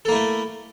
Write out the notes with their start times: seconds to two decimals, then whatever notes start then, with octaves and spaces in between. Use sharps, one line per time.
0.05 A4
0.08 A#3
0.12 E4
0.15 A3